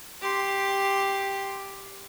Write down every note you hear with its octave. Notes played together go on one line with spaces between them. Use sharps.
G4 C6